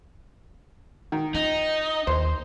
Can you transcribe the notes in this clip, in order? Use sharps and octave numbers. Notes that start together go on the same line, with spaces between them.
D#3
D#4 F4
D#2 C5